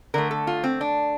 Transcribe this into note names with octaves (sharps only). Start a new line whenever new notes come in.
D3 A3 A#4
A4
F4
C4
D4